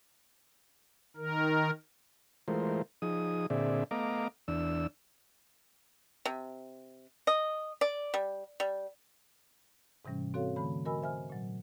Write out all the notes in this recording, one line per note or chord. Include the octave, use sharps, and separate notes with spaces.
D#3 A#4
E3 G#3 A3 F4 A#4 C5
F3 D#4 G#4 D#6
A#2 D3 C4 G#4 D5 E5
A3 B3 D#5 F5 A#5 D6
E2 D4 E6
C3
D#5
D5
G3
G3
G#2 C3 E3 G3 C#4
C4 F#4 A4 C#5 F5
D3 E3 A3 B5
F#4 A#4 D#5 G#5 B5 E6
C5 E5 G#5 F6
A#2 F#3